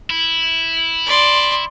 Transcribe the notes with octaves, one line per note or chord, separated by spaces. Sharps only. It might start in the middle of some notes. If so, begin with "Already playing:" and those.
E4
D5 C6